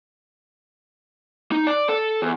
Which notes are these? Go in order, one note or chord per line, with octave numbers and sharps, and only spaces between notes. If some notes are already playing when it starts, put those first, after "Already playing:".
D#4
D5
A4
E2